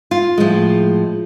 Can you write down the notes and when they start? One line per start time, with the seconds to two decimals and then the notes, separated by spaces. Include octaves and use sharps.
0.11 F4
0.38 A2 F3 G#3